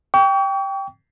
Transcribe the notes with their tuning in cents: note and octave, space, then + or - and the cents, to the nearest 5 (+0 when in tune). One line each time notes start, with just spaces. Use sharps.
G5 +0 C#6 +40